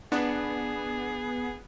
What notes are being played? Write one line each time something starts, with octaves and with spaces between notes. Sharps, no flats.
B3 D4 G#4